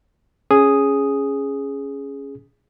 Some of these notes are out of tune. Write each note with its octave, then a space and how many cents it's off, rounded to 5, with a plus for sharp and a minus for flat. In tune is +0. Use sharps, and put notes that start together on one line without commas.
C#4 +0 G#4 +0 D#6 +0